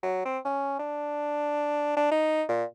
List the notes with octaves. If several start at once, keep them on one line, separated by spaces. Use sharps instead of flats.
F#3
C4
C#4
D4
D4
D#4
A#2